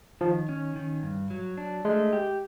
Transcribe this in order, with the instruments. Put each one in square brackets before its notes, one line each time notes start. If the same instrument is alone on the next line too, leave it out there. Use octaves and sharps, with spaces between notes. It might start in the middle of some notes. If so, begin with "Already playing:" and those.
[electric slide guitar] D#3 [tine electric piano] F3
[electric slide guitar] C#4
D#3
G2
F#3
D4
[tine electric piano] G#3 [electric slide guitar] A3
[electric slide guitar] G4